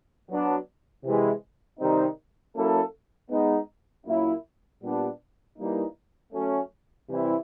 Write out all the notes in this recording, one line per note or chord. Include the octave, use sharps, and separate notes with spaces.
F#3 B3 D4
C3 E3 G#3
C3 D#3 G3 C4 D#4
F#3 A#3 C#4 E4 A4
G#3 B3 D#4
A#2 F#3 A#3 C#4 E4
A#2 G3 B3 D4
E3 G3 A#3 D#4
F#3 A3 C#4
C3 E3 G3 C4 E4